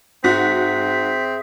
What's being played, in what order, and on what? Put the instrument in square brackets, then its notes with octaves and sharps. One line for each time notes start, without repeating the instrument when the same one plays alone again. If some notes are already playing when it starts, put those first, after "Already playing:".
[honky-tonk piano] G#2 F#4 [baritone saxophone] C4 [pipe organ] G#4 E5 [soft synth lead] B6